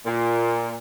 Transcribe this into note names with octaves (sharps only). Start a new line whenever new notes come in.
A#2